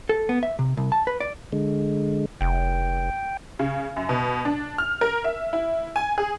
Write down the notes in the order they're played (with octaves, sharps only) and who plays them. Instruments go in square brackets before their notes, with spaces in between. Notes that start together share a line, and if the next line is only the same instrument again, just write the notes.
[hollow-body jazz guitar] A4
B3
E5
C3
C2
A5
B4
D5
[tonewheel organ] D3 G#3
[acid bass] F1 [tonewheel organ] G5
[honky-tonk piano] C#3
F#2
B2
D4
F6
A#4
E5
E4
G#5
G#4